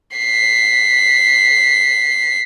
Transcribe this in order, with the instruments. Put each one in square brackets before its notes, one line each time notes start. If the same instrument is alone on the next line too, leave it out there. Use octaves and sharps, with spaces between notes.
[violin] B6 C7